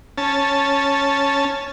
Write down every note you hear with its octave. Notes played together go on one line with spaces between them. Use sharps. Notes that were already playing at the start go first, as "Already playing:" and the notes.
C#4 A5